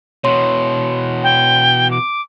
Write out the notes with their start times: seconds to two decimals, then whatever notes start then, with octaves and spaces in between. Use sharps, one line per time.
0.24 B2 E3 C#5 C6
1.23 G5
1.91 D6